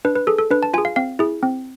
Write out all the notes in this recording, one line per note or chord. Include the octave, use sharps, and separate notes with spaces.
D4 B4
B4
G#4 A4
A4
D4 B4
A5
F4 G#4 G#5
F5
C4 F5
E4 G#4
C4